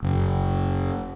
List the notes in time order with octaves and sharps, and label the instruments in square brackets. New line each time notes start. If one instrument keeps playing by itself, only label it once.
[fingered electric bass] F#1